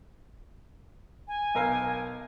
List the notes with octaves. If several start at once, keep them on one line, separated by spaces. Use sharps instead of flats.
G#5
B1 A#4 F5